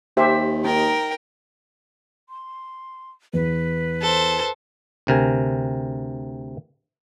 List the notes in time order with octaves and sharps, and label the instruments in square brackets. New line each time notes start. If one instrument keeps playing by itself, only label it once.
[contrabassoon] D#2 [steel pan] G4 C5 E5
[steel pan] D#4 [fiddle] A#4 G5
[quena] C6
[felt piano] E2 [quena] B4
[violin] A4 C5
[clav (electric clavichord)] D2 C3 A#4 G#5